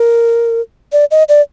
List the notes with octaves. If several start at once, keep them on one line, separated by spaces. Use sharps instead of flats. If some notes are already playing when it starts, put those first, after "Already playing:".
Already playing: A#4
D5
D#5
D5